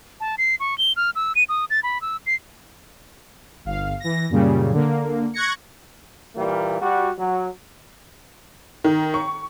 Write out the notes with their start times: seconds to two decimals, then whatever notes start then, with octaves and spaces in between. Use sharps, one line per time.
0.20 A5
0.38 C7
0.60 C#6
0.78 G7
0.96 F6
1.15 E6
1.35 D#7
1.49 D#6
1.70 A6
1.83 B5
2.01 E6
2.26 C7
3.65 G1 F5
4.00 E3 A#6
4.29 F#2 A#2 C#3 G3
4.72 D3 A#3
5.33 C#6 F#6 G#6 A#6 C#7
6.36 A#2 E3 G3 A#3
6.81 G3 F#4
7.18 F#3
8.84 D#3
9.14 C#6